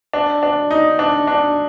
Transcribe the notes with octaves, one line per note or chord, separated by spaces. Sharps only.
D4
D4
D#4
D4
D4